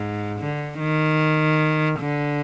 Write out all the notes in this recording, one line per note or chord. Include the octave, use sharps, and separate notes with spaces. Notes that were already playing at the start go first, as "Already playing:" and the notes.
Already playing: G#2
D3
D#3
D3